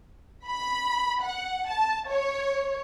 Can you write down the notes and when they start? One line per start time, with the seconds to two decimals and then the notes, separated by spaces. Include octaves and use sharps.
0.48 B5
1.22 F#5
1.69 A5
2.08 C#5